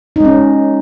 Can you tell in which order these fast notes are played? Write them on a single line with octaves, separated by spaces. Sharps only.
D#4 G#3 C#4